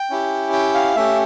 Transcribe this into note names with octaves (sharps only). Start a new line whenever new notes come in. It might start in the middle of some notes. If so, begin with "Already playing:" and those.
Already playing: G5
C#4 E4 G4
G5
F5
A3 C#4 G4 E5